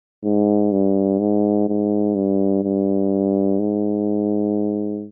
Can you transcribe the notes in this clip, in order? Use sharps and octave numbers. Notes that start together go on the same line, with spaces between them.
G#2
G2
G#2
G#2
G2
G2
G#2